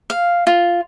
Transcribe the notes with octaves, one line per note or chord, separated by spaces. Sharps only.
F5
F4